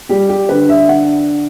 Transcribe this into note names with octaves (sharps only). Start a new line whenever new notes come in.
G3 G4
G4
D3 B4
E5
D3 F#5